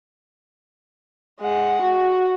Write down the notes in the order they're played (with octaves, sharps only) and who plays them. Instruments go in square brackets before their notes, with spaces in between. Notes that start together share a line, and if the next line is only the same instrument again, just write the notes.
[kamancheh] G#3 F#5
F#4